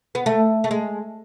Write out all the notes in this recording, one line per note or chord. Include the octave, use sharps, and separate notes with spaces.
B3
A3
A3
G#3